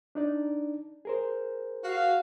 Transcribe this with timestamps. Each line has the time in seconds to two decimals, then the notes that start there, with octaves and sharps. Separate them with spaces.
0.15 D4 D#4 D5
1.05 G#4 A#4 C5
1.84 F#4 F5